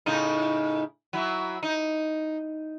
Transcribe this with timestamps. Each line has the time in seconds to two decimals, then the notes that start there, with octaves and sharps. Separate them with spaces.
0.06 A2 C#3 D#4
1.13 F#3 E4
1.63 D#4